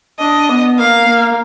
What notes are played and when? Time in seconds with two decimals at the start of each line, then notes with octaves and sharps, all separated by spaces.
0.19 D4 D#5
0.49 B3
0.78 A#3 F5
1.07 A#3